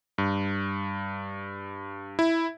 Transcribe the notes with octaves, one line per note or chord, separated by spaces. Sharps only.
G2
E4